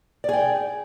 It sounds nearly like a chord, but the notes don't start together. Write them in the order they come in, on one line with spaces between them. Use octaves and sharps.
D5 G#4 G5